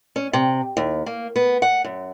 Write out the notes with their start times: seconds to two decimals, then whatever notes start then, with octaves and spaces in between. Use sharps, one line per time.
0.16 C#4
0.33 C3
0.77 D#2
1.06 A#3
1.36 B3
1.62 F#5
1.85 F#2